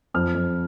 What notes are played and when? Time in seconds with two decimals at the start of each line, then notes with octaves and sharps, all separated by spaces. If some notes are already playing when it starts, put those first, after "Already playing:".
0.14 F2 F6
0.35 F2